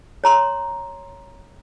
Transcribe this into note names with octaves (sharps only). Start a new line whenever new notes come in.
C#5 A#5 C6